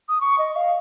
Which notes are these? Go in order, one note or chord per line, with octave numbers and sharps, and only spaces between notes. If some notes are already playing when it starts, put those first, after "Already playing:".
D#6
C#6
D#5
F5